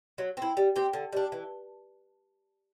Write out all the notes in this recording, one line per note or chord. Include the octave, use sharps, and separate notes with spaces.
F#3
C4 E4
G3
C4 G4
D3
G3 D4
E3